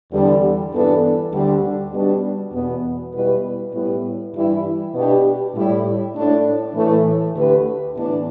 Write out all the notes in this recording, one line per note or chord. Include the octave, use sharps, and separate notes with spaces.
E2 D3 G3
G2 E3 B3 D4 A4
D2 D3 G3 D4
B2 G3 D4
E2 B2 B3
B2 G3 B3 E4 B4
A2 G3 B3 E4 B4
G2 E3 G3 E4
B2 B3 D4 G4
A2 G3 E4
A2 A3 D4
A2 E3 A3
D2 D3 A3 G4 B4
A2 E3 B3 D4